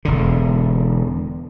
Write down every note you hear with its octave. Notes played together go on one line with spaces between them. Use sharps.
E1 D3